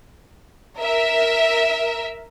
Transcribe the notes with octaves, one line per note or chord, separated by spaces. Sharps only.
A#4 E5